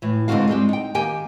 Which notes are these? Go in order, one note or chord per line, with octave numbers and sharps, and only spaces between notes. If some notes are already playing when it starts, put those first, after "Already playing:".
A2 E3
G#2 D3 C4 D#4 F#4 F5
G3 G#3 C4 G4
D#4 G5
D#3 A#3 G4 G5 G#5